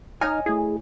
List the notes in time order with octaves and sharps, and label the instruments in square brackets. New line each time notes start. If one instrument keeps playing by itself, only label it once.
[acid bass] D#4 [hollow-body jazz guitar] C#5 D#5 G#5 [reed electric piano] F6
[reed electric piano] A3 E4 [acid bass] G#4